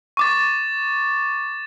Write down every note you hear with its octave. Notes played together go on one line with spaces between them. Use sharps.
C#6 D6 A6